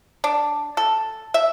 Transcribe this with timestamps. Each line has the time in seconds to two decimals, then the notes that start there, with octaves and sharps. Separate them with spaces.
0.24 D4
0.77 A4
1.34 E5